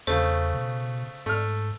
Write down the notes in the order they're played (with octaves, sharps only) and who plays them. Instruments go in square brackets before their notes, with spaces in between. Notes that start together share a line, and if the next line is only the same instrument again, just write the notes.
[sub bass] E2 [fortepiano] C#3 A3 [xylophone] C5
[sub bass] B2
[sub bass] G#2 [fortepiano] A3 F6